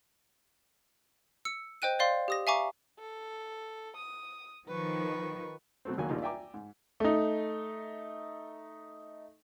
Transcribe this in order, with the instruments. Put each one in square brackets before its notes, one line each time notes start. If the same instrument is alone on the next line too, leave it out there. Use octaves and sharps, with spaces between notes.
[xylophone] E6 C#7
C5 D#5 G5 F#6 D#7
C5 D5 F5 C6
G4 D#6 A#6
E5 F5 G#5 A#5 C#6 D6
[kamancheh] A4
D#6
[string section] D#3 F3 [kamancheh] B4 C#6
[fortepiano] B2 F#3 A3 C4
G#1 D#2 F#3 A#3 G#5
A#1 D#2 G3 A#3 D#4 F4
D5 E5 G5 G#5 A#5 D6
G#2
[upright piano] A3 D#4